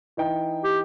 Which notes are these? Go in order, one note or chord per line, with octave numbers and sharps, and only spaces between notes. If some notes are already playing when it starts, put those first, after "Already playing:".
E3 D#4 G5
G4